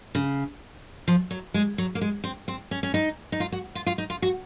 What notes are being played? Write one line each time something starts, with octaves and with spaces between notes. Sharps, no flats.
C#3
F3
F#3
G#3
F#3
A#3
G#3
C4
C4
C#4
C#4
D#4
D#4
F4
F#4
F4
F4
D#4
F4
F#4